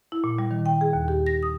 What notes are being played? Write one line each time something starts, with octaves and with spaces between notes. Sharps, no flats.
E4
A#2
G3
D#3
G5
G#4
D#2
G4
A#6
D#6